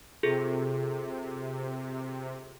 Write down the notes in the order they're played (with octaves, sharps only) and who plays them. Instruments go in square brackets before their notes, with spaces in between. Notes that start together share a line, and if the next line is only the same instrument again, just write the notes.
[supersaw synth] C3 [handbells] F4 G#4 A4